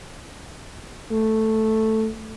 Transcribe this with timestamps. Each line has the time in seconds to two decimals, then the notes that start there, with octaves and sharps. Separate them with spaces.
1.11 A3